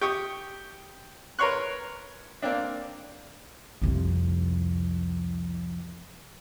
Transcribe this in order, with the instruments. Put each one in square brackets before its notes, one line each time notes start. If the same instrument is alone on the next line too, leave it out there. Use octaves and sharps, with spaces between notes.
[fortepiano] G4 C#6 D#6
A#4 B4 C#5 C6 C#6 F#6
A#3 C4 D4
[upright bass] C2 F2